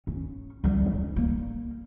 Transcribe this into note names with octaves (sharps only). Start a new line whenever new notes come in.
C#4
D2 G3
C#4
A#3